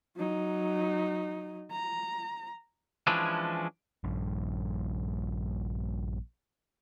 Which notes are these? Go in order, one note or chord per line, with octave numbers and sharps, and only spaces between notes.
F#3 D#4
A#5
E3 F3 G#3 C#4 D4 E4
A#1 G2